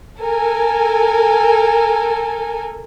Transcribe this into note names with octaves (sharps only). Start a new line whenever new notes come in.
A4 A#4 G#5